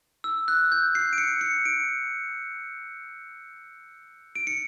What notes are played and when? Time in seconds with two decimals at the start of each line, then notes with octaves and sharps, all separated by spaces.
0.24 E6
0.48 F#6
0.72 G6
0.95 C7
1.13 D7
1.18 C#7
1.41 C#7
1.66 D7
4.35 D7
4.47 C#7